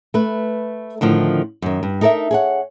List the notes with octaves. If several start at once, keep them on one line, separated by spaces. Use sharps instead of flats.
A3 B4
A2 D3 D#3 F3
F#2 D#3
G2
D#4 A4 A#4 D5 E5
G#4 C#5 F#5